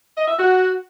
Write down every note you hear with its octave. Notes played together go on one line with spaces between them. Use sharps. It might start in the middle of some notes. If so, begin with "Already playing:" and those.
D#5
E5
F#4